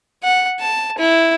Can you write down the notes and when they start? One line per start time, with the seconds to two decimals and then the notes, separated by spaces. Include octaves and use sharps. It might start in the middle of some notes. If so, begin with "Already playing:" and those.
0.23 F#5
0.60 A5
0.98 E4